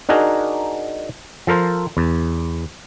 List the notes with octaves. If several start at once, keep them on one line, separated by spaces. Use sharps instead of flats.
D4 D#4 F#4 G#4 A#4
F3 A4 A#4 C5
E2